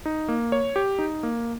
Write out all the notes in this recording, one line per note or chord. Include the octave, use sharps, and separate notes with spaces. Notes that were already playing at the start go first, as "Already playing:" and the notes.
D#4
A#3
C#5
G4
D#4
A#3